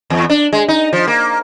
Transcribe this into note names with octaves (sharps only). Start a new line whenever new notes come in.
E2
D4
G#3
D#4
F3
A#3